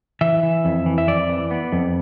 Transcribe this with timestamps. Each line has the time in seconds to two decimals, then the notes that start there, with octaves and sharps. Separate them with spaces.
0.21 E3 E5
0.43 E3
0.65 F2
0.86 E3
0.98 E5
1.07 F2 D5
1.30 E3
1.51 B3
1.73 F2